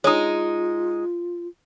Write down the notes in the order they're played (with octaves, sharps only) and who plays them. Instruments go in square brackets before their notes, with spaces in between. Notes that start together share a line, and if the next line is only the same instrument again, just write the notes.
[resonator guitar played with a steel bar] G#3 D#4 [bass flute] F4 [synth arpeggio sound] C#5 D#6